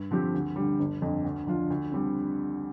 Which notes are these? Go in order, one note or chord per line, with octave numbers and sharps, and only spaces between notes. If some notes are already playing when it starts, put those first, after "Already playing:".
Already playing: G2
D3 F3 C4 G4
D2
D3 G3
G1
F2 D3
D2
D3 F3 D4 F4
D2
D3 G3 C4